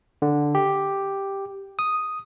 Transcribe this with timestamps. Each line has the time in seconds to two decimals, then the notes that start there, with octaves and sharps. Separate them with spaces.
0.22 D3
0.55 G4
1.79 D#6